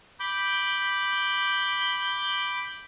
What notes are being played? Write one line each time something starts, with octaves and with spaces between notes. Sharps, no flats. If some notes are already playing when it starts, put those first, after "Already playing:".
B5 D6 G6